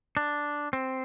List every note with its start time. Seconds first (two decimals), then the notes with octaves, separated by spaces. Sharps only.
0.17 D4
0.73 C4